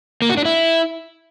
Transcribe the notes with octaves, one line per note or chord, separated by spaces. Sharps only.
A#3
F#4
D4
E4